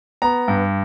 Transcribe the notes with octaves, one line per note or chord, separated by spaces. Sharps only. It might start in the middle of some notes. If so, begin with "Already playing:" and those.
B3 A#5
G2